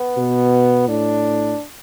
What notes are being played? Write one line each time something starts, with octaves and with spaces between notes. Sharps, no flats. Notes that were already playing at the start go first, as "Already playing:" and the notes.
Already playing: B3
B2
A2 D4